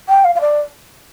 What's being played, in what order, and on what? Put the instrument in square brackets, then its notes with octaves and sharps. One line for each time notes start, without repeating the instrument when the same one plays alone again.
[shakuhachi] G5
F5
F5
D5